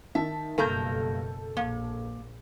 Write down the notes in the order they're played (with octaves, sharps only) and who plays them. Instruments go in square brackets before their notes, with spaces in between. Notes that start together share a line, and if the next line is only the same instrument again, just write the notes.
[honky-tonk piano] D#3 A5 [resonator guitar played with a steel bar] E5
[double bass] F#1 B2 [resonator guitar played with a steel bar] G2 A#3 A#5 [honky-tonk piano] A4 G6
[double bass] A#1 [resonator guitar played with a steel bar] A#3